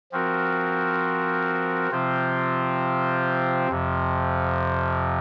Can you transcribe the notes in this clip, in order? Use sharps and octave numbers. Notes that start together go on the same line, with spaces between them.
F3 C4 F#4 A#4
C3 F3 C4 F4 C5
F2 C3 F3